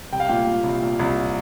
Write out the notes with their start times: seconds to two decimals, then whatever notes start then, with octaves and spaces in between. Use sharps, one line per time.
0.13 C2 G5
0.20 F5
0.29 A#2 G5
0.47 A#2
0.64 C2
0.82 A#2
1.00 C2